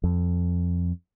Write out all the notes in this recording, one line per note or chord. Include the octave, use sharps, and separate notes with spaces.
F2